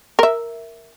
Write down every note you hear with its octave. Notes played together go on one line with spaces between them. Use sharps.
A#4 E5